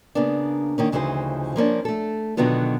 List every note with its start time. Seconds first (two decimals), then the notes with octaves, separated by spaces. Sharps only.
0.15 C#3 A#3 B3 D4
0.78 D#3 A#3 C#4
0.92 D2 C#3 E3 F3 D#4 C5
1.56 F3 A#3 C#4 D4
1.85 A3 A4
2.37 B2 D3 D#3 F#3 B3 F4